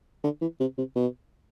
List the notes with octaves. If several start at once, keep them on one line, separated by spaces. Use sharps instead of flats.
D3
E3
C3
C3
B2